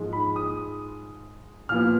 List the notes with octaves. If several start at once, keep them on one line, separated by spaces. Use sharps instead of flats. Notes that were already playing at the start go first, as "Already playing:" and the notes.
Already playing: G#2 F3 G#3
B5
D#6
A#2 F3 B3 F6